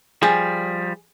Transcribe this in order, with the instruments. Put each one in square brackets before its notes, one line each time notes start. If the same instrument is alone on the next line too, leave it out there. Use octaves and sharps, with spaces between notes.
[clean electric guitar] F3 G3 [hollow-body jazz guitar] G#4